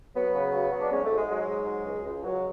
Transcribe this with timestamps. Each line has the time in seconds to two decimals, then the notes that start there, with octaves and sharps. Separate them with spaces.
0.15 F#3 B3
0.34 C#3
0.53 F#3
0.72 F#3
0.81 D4
0.91 G#2 C#4
1.04 A3
1.10 G#2
1.16 G#3
1.29 F#3 G#3
1.48 G#2
1.66 F#3
1.86 C#2
2.05 C#2
2.24 C#2 F#3